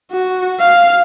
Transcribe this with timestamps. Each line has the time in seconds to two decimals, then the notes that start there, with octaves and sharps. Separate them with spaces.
0.12 F#4
0.60 F5